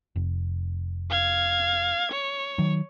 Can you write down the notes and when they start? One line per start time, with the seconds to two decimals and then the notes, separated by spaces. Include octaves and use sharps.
0.16 F1
1.10 F5 G#6
2.12 C#5
2.58 D#3 F#3